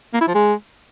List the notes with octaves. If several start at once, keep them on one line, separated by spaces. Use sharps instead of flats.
A#3
E4
F3
G#3